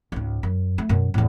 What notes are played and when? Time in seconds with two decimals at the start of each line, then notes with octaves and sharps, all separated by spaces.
0.12 C#2 G#2
0.43 F#2
0.78 A3
0.89 F#2 B2
1.14 E2 A2